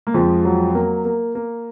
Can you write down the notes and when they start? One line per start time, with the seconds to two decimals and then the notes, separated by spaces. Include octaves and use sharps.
0.07 A#3
0.14 F2 F3 G#3
0.45 F#3
0.75 A#3
1.05 A#3
1.35 A#3